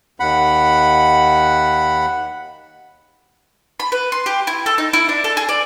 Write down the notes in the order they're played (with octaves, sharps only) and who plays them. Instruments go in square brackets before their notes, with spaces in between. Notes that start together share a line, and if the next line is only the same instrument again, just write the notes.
[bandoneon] D#2 F#5 B5
[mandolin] B5
B4
C6
G4
E4
A4
D#4
E4
D4
A4
G#4
D5